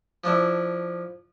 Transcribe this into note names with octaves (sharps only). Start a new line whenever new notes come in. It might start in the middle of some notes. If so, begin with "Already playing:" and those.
F3 D4 E4